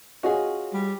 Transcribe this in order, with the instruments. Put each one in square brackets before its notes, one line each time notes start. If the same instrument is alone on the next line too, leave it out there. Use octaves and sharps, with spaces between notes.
[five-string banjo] C#4 G#4 [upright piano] F4 F#4 D#5
[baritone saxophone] G3